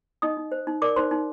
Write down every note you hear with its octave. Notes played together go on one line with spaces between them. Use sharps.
D#4 D#5 D#6
D#4
C5
D#4
A#4 D5 D6
D#4 C5 C6
D#4